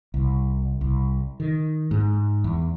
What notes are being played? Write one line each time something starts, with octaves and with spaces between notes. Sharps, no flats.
C2
C2
D#3
G#2
E2